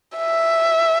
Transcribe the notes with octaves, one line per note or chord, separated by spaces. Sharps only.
E5